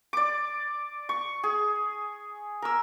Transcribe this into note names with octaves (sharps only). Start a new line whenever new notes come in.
D5 D6
C#6
G#4
A#4 E6